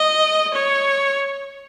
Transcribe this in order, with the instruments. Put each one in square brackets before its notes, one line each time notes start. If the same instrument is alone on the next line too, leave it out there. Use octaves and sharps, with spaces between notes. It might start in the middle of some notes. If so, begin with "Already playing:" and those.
Already playing: [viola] D#5
C#5